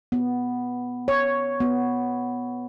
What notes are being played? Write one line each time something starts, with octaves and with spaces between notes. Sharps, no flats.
B3
C#5
B3